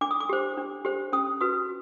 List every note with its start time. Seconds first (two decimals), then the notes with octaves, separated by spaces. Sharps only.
0.01 D4 D6
0.11 D#6
0.20 D6
0.29 G4 C5
0.57 D4
0.85 G4 C5
1.13 C#4 D#6
1.41 F#4 B4 D#6